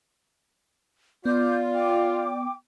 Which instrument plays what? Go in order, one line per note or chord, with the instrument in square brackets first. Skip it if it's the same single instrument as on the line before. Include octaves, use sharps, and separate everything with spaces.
[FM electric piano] B3 [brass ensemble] F4 [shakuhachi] D5 [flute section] D6 G6
[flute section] G5 D6